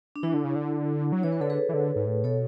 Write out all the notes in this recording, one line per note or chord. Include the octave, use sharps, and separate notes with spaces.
D4
E3 E4
D3
C#3
D3
F#3
E3 C#5
B4
D3 A4
G#4 B4
E3
D3
G#2
A2
B2 A4 C#5